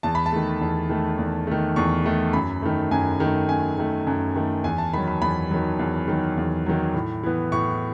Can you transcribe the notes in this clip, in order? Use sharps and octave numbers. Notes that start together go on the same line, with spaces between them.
E2 A5
B5
A5
D#3 A3
E2
D#3 A3
E2
D#3 A3
E2 C#6
D#3 A3
F#2 B5
D#3 A3
F#2 G#5
D#3 A3
F#2 G#5
D#3 A3
F#2
D#3 A3
E2 G#5
A5
D#3 F#3 B5
B5
E2 B5
D#3 F#3
E2
D#3 F#3
E2
D#3 F#3
A2
E3 B3
A2 C#6